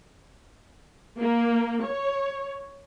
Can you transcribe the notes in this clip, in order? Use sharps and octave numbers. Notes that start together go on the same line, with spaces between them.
A#3
C#5